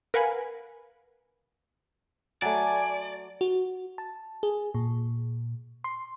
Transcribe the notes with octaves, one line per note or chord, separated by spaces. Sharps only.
A#4 B4 F5 F#5 G#5 B5
F#3 A3 D5 G#5
F#4
A5
G#4
A#2
C6